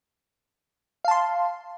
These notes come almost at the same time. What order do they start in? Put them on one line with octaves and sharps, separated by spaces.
F5 A5 C6